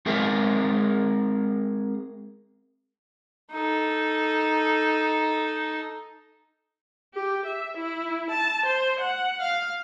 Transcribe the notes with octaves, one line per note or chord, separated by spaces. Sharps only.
G#3 C4 G#4 A#4 E5
D#4 A4
G4
E5
E4
A5
C5
F#5
F5